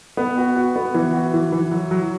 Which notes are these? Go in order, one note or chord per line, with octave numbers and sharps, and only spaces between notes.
B3
F#4
F#4
B3
E3
F#4
E3
E3
F#3
F#3